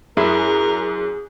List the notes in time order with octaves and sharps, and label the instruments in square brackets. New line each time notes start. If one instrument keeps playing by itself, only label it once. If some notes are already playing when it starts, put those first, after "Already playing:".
[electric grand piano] F#2 [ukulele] E4 [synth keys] G#4 [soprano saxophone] A#4